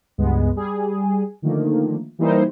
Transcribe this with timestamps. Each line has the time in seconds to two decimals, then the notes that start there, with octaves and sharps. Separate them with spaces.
0.18 C#2 G2 G#3 B3
0.56 G3 G#4
1.42 D3 D#3 F3 A3 A#3
2.19 E3 G3 A#3 D#4 E4 C5